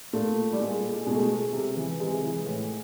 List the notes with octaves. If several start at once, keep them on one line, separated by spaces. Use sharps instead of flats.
A#2 A3
G3
A#2 G#3
G#3
B2 G#3
A3
G#3
C3
E3
C3 G#3
E3
A2